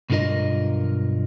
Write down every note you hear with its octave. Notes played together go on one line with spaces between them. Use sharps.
B1 G2 D3 F4 A#4 D#5